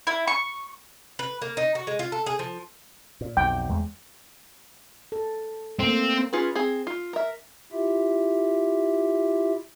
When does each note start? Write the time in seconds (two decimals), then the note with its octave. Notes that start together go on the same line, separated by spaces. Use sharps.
0.07 E4
0.27 C#6
1.19 B4
1.42 A#3
1.57 D#4
1.75 F#4
1.87 G#3
1.99 F4
2.12 A4
2.26 G#4
2.39 F3
3.21 A#2
3.37 B1 F2 G5
3.69 E2 G#3 A3
5.12 A4
5.79 A3 A#3 C4
6.33 C#4 F4 G#4 B4
6.55 C4 G#4
6.87 F4
7.13 A#4 E5
7.72 E4 F4 G4 E5